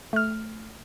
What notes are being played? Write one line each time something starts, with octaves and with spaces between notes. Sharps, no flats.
A3 F6